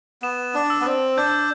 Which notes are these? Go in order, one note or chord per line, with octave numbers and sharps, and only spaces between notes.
B3 E7
D4
E6
B3
C4
D4 G6